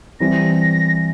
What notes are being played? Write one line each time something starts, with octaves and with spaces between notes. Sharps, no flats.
E3 G3 C4 A#6